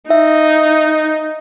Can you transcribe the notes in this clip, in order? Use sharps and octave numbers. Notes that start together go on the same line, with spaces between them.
D#4 E5